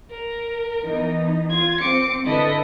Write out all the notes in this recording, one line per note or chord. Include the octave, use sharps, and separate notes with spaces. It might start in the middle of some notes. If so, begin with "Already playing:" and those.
A#4
E3 B3 D#4
F4 G#6
C4 D6 C#7
D3 E4 A4 B4 D#5